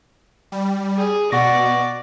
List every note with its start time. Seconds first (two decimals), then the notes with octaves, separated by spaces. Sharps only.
0.52 G3
0.97 G#4
1.32 B2 D5 F#5 C#6 A#6